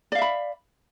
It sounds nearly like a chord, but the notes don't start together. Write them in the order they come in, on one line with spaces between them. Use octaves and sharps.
D5 F5 E5 B5